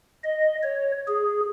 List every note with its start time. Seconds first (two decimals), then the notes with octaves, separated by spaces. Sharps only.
0.23 D#5
0.63 C#5
1.08 G#4